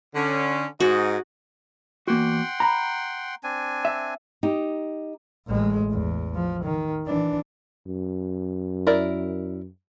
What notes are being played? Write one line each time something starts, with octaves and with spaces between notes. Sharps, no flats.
D3 C#4
G#2 D#4 F#4 G#4
E2 A#3 F#4 F#5 G5 C6
A#5 B5
C4 D4 G#5
E5
D#4 G4
A1 G#3
E2
F3
D#3
E3 D4
F#2
E4 A#4 D5